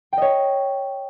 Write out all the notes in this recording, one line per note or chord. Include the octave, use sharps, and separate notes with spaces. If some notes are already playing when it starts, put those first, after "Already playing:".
C#5 D#5 G5